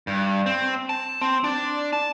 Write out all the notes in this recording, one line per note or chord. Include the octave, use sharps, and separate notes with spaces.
G2
C4
A5
C4
D4
A5